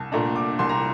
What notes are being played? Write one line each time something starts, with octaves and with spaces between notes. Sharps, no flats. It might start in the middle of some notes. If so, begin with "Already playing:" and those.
Already playing: C2 A5
A#2 A3 D4 A#5
D6
C2 C6
A#5